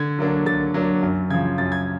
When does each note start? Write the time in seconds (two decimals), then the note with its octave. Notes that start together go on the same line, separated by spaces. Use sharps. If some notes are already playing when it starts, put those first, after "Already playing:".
Already playing: D3 G#6
0.19 F#3 A#3 D4
0.46 D3 A6
0.74 F#3 A#3 D4
1.03 F#2
1.30 C#3 F3 G#6
1.58 F#2 A6
1.72 G#6